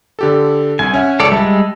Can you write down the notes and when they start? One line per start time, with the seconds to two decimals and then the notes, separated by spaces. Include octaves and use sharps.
0.19 D3 G4 A4
0.79 C2 G#5
0.94 C#4 E5 F#5
1.20 C#2 A4 C#5 D5 E6
1.32 G3 G#3 E5 A5 E6